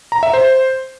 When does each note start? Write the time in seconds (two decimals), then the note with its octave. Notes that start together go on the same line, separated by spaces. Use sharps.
0.12 A#5
0.23 E5
0.33 C5